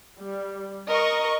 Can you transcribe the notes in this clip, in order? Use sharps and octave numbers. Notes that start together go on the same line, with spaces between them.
G3
A#4 D#5 C#6